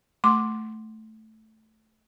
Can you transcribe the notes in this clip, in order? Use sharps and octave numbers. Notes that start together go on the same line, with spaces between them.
A3 C6 D6